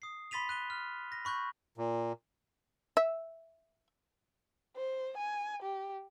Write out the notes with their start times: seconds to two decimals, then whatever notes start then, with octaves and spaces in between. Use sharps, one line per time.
0.02 D#6 C7
0.31 B5 C6 A6 B6 D#7 F7
0.49 F#6 D#7 G7
0.70 F6
1.12 A#6
1.25 B5 C#6 F#6 G6
1.78 A#2
2.97 E5
4.76 C5
5.17 G#5
5.62 G4